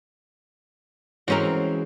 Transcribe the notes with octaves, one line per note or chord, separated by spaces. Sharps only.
E3 G#3 C4 C#4 F#4 A#4